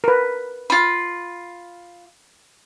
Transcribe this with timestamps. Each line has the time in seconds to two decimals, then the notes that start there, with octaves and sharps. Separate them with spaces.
0.04 A#4 B4
0.70 F4 B5